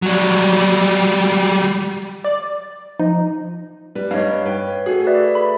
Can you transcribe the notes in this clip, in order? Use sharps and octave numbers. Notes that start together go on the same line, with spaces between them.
F#3 G3
D5
F3 D#4
G3 B4
G2 D#4 C#5 F5
B4 G5
A3 F#4 G#4
B4 D5 E5
B5